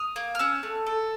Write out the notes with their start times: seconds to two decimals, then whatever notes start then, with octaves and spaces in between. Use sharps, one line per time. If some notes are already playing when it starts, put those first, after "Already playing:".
Already playing: D#6 F6
0.16 A#3
0.35 F6
0.39 C#4 E6 F#6
0.63 A3
0.86 A4